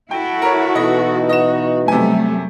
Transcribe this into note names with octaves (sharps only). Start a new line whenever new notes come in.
E4 F#4 A4 G5
A#4 C#5
B2 E3 D#4 D#5
F#4 D#5 E7
F#2 C3 G3 A3 G#5